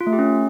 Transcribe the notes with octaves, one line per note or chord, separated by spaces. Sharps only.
F4
A3
G4
C#4